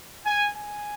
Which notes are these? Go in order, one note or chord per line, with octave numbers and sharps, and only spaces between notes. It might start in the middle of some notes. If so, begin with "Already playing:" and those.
G#5
G#5